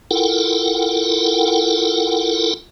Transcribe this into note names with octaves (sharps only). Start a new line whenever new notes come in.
E4 F4 A4 A#4 F#5 G5